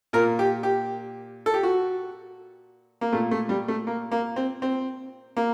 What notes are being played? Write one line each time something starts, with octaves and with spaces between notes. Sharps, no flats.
A#2 A#4
G4
G4
A4
G4
F#4
A#3
A#2 A3
A3
G3
A3
A#3
A#3
C4
C4
A#3